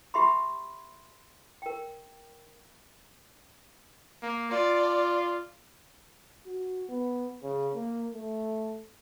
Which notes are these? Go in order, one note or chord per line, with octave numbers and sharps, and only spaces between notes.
G4 E5 B5 C6
A#4 G5
A#3
F4 D5
F#4
B3
C#3
A#3
A3